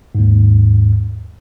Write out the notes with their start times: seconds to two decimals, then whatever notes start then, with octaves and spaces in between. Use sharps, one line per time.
0.15 D#2 G#2